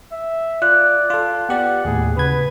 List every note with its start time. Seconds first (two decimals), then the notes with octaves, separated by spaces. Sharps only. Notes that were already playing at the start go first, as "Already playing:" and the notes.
0.12 E5
0.62 F4 D5 F#6
1.10 F4 A4
1.49 B3 G4 D5 F#5
1.85 D#2 A2 G#4
2.17 C#3 B4 G#6